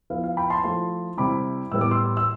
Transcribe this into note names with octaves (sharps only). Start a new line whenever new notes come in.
F3 B3 E4 F5
F5
G5 B5
A5 C6
F3 A3 E4 A5 C6
C3 G3 C4 E4 B5 D6
A2 E3 G3 B3 E4 E6
D6
C6 E6
E6